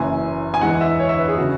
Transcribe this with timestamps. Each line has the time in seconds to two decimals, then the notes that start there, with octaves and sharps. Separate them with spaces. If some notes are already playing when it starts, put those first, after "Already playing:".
Already playing: F#1 F#2 E3 G#5
0.54 G#5
0.61 E2 E3 G#3 F#5
0.81 E5
0.99 C#5
1.09 E5
1.19 B4
1.28 G#4
1.37 C#3 F#4